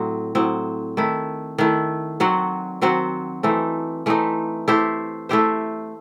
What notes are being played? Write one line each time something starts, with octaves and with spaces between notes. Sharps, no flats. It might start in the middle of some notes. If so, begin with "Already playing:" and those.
Already playing: A2 F#3 C4
A2 F#3 C4
D#3 A3 E4
D#3 A3 E4
D#3 F#3 C4 F#4
D#3 F#3 C4 F#4
E3 A3 C4 D#4
E3 A3 C4 D#4
A3 E4 G4 C5
A3 E4 G4 C5